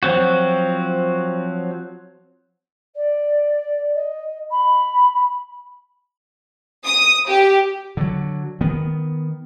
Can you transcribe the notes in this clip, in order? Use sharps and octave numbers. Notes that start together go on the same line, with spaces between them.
F3 F#3 C4 F#4
D5
D#5
B5
D#6
G4
D3 F#3
D#3 B3